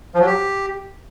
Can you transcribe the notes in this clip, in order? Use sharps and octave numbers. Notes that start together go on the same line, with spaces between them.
F3
F#3
G4